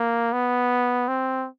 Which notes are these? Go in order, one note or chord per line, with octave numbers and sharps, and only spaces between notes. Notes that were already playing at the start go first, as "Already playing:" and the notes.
Already playing: A#3
B3
C4